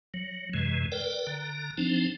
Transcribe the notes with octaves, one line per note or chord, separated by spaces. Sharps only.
F#3
F#2 C3 E3 G#3
A#4 B4 D5 G5
D3 A#5
F3 C4 D4 D#4